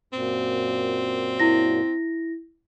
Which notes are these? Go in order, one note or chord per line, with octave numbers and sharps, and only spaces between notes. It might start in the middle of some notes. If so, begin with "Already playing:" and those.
F#2 A#2 C4
E4 A#6